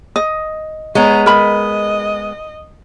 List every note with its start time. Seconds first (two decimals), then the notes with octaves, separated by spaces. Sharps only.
0.16 D#5
0.95 G#3 B3 C#5 A#5
1.26 A#4 D#5 B5